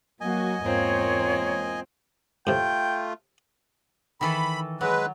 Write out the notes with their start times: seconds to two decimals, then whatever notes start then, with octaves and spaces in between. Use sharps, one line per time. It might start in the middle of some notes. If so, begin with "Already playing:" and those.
0.21 F#3 A#3 F#4 D#5 G#5
0.65 E2 G#2 A#3 C4 F4 C#5
2.47 A2 C3 A3 F4 G5
4.21 D#3 E3 A4 B5
4.81 F#3 G#3 B4